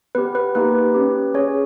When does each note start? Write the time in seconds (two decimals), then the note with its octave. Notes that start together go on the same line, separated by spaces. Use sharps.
0.15 B3 G4 B4
0.35 B4
0.55 A#3 D#4 G4 B4
0.94 C#4 G4
1.34 C#4 G#4 C#5